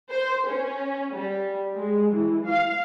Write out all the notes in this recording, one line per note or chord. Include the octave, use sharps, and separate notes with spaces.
C5
C#4
G3
G#3
E3
F5